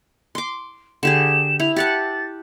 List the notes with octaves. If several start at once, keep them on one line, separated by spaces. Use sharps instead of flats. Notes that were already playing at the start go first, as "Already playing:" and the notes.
C6 D6
D3 G4 G#4 E7
E4 F7
G4 F#5 A5 A6